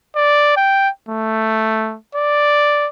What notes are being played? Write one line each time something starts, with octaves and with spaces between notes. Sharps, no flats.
D5
G5
A3
D5